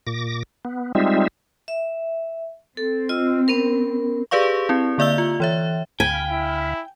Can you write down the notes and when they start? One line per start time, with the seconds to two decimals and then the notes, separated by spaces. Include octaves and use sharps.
0.07 A#2 D6 A#6
0.65 B3
0.95 G3 G#3 C4 D#4 F4 E5
1.68 E5
2.77 C4 A4
3.09 F4 D#5 E6
3.48 B3 C#4 A#4
4.31 G4 G#4 B4 D5 F5 C#6
4.69 C4 E4
4.98 D3 A#3 D5 E5 E6 G7
5.18 F4
5.40 E3 C#5 E5
6.00 D2 F5 G5 G#5 B5
6.32 E4